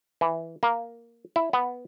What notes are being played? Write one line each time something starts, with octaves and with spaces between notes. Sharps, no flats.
E3
A#3
E4
B3